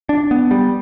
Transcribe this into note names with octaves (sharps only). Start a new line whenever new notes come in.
D4
B3
G3